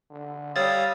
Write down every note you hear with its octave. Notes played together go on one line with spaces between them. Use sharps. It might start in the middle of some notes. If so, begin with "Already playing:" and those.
D3
G3 C#5 F5 D#6 E6 A6